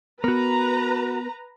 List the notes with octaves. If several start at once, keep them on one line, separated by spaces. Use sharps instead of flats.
B3 F#4 A#4 B4 A#5